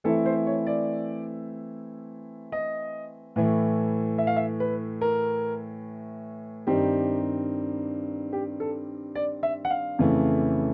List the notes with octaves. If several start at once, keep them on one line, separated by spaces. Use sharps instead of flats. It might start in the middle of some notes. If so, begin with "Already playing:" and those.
E3 A3 C4 E4 A4
C5
C#5
D5
D#5
A2 E3 A3
E5
F5
E5
B4
A#4
G2 D#3 G3 C4 D#4 G4
G4
A4
D5
E5
F#5
F5
F2 C#3 E3 A3